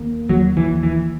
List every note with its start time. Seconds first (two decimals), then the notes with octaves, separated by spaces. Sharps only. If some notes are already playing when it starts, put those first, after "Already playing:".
Already playing: D#2 A#3
0.29 D#2 F#3
0.57 E3
0.70 D#2
0.83 E3